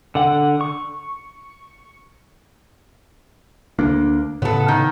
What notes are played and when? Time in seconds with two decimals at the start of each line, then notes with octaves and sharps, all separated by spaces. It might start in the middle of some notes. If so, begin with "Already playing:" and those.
0.15 D3 F#5
0.61 C#6
3.79 D2 A#3 D4
4.42 A2 C#3 B3 A4
4.68 D#3